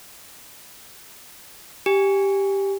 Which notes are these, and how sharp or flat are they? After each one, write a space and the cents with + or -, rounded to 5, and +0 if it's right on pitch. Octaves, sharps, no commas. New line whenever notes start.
G4 +0 G#5 -15